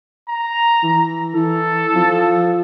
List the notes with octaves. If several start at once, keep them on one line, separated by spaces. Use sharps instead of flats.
A#5
E3
E3 A4
F3